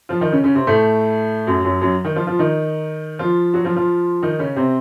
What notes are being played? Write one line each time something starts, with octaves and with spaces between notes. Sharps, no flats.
F3 F4
D#3 D#4
C#3 C#4
C#3 C#4
C3 C4
A2 A3
F#2 F#3
F#2 F#3
F#2 F#3
D#3 D#4
F3 F4
F3 F4
D#3 D#4
F3 F4
F#3 F#4
F3 F4
F3 F4
D#3 D#4
C#3 C#4
C3 C4